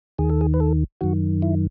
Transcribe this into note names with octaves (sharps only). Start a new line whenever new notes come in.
D#2 D#3 G#4
A4
G#4
B4
A4
F#2 D#3 F#4
E4